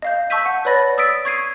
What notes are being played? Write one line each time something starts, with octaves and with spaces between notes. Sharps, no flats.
D#5 F5 G6
A5 C#6 E6 G6 B6 D#7
F#5
B4 C#5 D5 B5 A6 A#6
D#6 E6 A6 B6 D7
C#6 G#6 C7 D#7